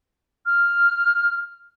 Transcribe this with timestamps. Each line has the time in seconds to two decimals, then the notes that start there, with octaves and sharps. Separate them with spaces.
0.46 F6